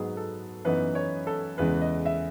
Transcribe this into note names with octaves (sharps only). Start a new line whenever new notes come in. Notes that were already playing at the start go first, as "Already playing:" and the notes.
Already playing: G#2 F#3 B3 D#4 G#4
A4
F#2 E3 B3 D#4 B4
C#5
A4
E2 C#3 E3 G#3 B4
D#5
E5